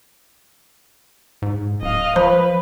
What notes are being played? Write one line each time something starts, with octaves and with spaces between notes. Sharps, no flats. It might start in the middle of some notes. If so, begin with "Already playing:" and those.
G#2
D1 D#5 F5
F3 B4 C5